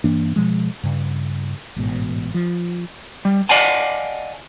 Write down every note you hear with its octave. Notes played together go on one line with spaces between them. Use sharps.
G2 E3 A#3 D4
B2 F3 G#3
G2 C#3
A1 G#2 B2
F3
G3
D5 D#5 F5 F#5 G#5 A5